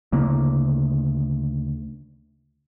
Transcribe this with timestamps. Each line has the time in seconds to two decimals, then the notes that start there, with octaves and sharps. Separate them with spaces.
0.12 D2 C#3 A#3